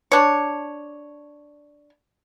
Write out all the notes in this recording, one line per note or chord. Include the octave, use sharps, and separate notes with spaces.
D4 C#5